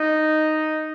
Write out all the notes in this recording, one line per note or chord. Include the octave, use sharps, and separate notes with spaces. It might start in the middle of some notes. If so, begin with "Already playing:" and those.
Already playing: D#4